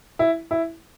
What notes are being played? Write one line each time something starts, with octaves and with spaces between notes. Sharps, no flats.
E4
E4